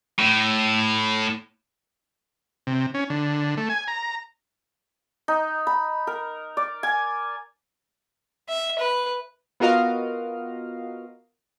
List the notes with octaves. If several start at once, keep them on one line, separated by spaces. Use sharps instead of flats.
A2
C3
C#4
D3
A3
G#5
A#5
D#4
B5
A#4
D5
G#5
E5
B4
B3 F4 F#4 A#4 D#5 F5